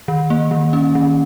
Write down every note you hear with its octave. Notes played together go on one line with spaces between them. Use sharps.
D#3
A#3
D#3
C#4
D#3